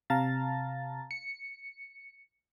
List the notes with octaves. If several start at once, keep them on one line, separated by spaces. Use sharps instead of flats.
C3 F5 A5 A#5 A6
C#7